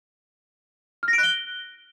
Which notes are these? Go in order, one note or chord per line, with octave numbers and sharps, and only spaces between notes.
F6
A#6
D7
F#6
G7